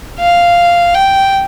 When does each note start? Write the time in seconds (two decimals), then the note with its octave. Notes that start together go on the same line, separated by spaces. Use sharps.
0.19 F5
0.94 G5